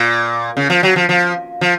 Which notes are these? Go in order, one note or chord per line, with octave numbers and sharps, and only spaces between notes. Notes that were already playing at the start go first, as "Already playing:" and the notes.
Already playing: A#2
C#3
F3
F#3
F3
F3
F3